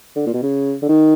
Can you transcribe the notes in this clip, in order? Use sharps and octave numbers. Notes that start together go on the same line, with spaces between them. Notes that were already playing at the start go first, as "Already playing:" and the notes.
D3
A#2
B2
C#3
D3
D#3